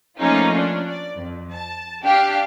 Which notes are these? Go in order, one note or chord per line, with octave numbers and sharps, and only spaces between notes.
F3 A3 A#3 C#4 D#4 F4
C#4 D4
D5
F2
A5
D4 G4 F5